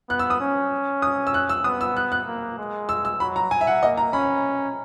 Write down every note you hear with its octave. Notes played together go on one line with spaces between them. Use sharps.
B3 F#6
E6
D#6
C#4
D#6
E6
F#6
E6
B3 D#6
E6
F#6
F#6
A#3
G#3
E6
E6
F#3 B5
A#5
G#5
E5
F#5
A#3 D#5
A#5
C#4 B5